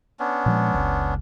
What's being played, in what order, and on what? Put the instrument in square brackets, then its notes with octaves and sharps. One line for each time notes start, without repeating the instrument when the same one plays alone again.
[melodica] B3 C#4 D4
[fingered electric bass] A#2 F3 G#3
F#1 C#2